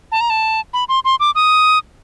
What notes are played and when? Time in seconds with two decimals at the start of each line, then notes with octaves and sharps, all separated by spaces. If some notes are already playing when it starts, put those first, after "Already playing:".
0.12 A5
0.21 A#5
0.30 A5
0.74 B5
0.89 C6
1.05 C6
1.20 D6
1.35 D#6